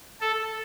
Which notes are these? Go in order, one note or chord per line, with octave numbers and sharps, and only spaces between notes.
A4